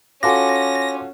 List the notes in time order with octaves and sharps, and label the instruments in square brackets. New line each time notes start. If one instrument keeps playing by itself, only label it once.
[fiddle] C#4 [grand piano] F4 F#4 A4 [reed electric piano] G#5 C6 D6 [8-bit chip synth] A#6